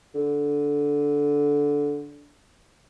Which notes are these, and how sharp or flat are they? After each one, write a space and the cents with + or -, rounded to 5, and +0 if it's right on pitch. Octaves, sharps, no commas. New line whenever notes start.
D3 -15